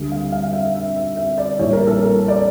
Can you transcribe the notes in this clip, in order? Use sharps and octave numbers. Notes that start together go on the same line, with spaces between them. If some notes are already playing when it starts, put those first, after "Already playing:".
Already playing: D2 D3 G3
F5
F5
F5
E5
E5
E5
E5
D5
A#1 A2 E3 G3 C#5
A#4
A4
A#4
D5